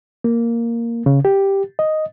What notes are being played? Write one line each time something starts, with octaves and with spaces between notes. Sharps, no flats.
A#3
C#3
G4
D#5